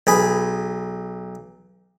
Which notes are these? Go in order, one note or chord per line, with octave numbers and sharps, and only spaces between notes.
B1 G#4 B5